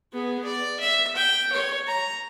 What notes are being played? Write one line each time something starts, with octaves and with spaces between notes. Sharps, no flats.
B3 G#4
D5
E5
G5
C#5
A#5